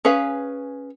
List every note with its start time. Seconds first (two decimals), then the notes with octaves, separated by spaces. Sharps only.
0.05 C#4 G#4 B4 F5